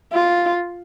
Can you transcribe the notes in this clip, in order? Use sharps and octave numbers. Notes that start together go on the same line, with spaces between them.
F4